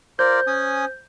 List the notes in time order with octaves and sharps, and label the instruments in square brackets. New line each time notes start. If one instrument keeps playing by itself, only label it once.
[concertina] F4 A#4 D5 [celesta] C5 [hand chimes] G6
[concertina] C#4 G#5 D#6